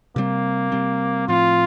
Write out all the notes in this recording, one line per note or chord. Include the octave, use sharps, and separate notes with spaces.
C3 G3 A#3 C4
C3 G3 C4
A2 F3 C4 F4